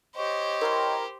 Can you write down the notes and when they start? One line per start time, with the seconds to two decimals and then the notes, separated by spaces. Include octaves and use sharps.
0.15 G4 C5 C#5 D#5 C#6
0.61 E4 A#4 G5 C6